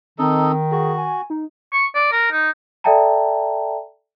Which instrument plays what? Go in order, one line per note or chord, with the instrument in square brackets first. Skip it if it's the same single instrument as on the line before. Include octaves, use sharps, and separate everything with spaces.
[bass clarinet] D#3 [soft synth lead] C4 [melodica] D#4 A4 D#5
[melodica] F#4 [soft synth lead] G#4
[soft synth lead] G#5
D#4
[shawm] C#6
D5
A#4
D#4
[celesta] A4 D5 E5 G5 A5 A#5